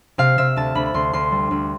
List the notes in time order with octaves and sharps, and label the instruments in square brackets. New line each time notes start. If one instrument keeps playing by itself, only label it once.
[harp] C3 F5
C3 E5
D2 A5
D2 B5
B5
D2 C6
D2 C6
G3
D2